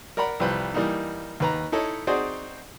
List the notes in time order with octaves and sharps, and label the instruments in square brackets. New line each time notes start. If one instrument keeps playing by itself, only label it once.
[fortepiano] A#4 D5 F#5 A#5 B5
C2 F3 G3 B4 C5
E3 G3 A#3 D#4
D#2 B4 A#5
D#4 E4 A4 C#5 D#5
C4 D#4 F#4 G#4 C5 D5